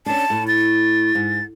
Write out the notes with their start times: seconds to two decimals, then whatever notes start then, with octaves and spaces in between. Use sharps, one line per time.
0.06 C#4 D4 A5
0.30 A2
0.47 A6
1.15 G#2